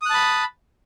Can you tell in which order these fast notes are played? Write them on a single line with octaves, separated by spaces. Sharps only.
D#6 F#6 A5 B5